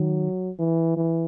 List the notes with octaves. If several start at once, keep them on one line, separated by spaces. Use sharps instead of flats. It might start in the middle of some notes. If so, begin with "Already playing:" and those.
Already playing: D#3 F#3
E3
E3